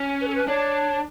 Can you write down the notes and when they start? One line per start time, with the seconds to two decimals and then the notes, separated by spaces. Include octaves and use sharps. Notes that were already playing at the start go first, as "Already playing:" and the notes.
Already playing: C#4
0.21 B4
0.27 A4
0.35 B4
0.48 D4 C#5